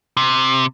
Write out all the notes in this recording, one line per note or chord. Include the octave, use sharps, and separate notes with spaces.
C3